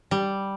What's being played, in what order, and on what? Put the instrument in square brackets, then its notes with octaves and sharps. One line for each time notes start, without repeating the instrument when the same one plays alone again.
[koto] G3